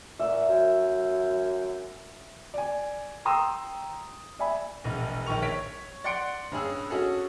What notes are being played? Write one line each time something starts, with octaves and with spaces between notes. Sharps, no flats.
A#2 E5
F#2
D5 G#5
G5 A#5 C6 D#6 E6
D5 E5 G#5 B5
E1 A#1
A#1 D#3 C#6 F7
C#5 B6 D7
D5 F#5 C6 C#7 D7
G2 C#4 G#4 E6
C#4 F#4 G#4 A4